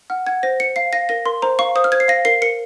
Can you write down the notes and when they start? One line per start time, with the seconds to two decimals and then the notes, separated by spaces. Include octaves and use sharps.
0.10 F#5 F6
0.27 F#5 G#6
0.43 C5 A#6
0.60 C5 C#7
0.76 F5 C7
0.93 F5 A#6
1.09 A#4 A#6
1.26 A#4 C6
1.42 C5 A#5
1.59 F5 C#6
1.75 C5 D#6
1.84 F6
1.92 C5 G#6
2.00 C7
2.08 F5 A#6
2.25 A#4 C7
2.42 A#4 C#7